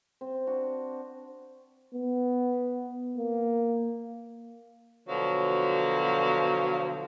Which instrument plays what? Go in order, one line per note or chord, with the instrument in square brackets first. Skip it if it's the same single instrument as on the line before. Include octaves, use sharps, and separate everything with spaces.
[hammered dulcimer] C4
D4 F#4
[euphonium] B3
A#3
[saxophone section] B2 D3 F3 F#3